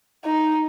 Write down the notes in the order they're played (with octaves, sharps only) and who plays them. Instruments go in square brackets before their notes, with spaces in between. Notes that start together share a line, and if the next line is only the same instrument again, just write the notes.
[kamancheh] D#4